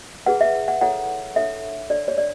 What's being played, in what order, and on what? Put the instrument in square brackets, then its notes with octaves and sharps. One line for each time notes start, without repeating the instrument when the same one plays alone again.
[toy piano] E4 G#4 B4 F#5
E5
F#5
E4 A4 C#5 F#5
D4 A4 C#5 E5
D4 A4 C#5 D5
C#5
D5